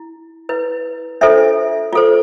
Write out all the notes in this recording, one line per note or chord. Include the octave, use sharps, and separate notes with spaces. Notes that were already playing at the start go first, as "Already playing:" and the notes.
Already playing: E4
E4 B4
D4 F4 A4 C5 E5
F4 A4 C5